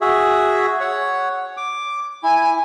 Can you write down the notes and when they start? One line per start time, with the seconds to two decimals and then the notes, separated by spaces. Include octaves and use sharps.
0.01 F#4 G#4 E5
0.80 C#5 F#5
1.57 D6
2.23 E4 G#5